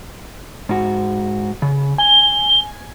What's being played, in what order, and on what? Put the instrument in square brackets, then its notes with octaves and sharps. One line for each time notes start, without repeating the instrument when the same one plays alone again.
[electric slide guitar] G#2 F#4
C#3
[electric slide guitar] G#5 [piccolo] G7